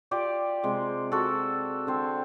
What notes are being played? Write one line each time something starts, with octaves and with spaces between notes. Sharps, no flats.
F4 G4 D5
C3 G#3
F#4 A4
D3 C4